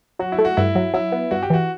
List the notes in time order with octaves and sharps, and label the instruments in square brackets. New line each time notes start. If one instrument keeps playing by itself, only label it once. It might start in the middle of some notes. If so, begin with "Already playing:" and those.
[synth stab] F#3 [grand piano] F#4
[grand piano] E4
[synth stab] A3
[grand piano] F#4
[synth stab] G2 [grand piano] E4
[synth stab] F#3
[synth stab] F#3 [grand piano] E4
[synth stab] B3
[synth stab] G2 [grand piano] F#4
[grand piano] G4
[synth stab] E3 [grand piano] F#4